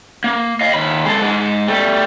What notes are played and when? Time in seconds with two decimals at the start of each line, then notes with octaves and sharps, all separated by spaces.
0.24 A#3
0.61 D#5 F5
0.74 D#2 B5
1.05 G#3 A4
1.22 G#2 G#3
1.68 G3 A3